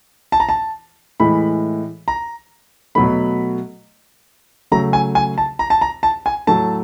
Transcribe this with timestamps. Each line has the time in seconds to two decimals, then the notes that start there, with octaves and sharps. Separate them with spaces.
0.32 A5
0.40 A#5
0.49 A5
1.20 A2 E3 G#3 B5
2.08 A#5
2.95 B2 F#3 A3 B5
4.72 C#3 F#3 A3 A#5
4.93 G#5
5.15 G#5
5.38 A5
5.59 A#5
5.70 A5
5.81 A#5
6.03 A5
6.26 G#5
6.47 A2 F#3 A3 A5